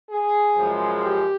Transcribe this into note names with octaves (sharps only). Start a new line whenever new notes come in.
G#4
F#2 C#3 F3 G#3
G4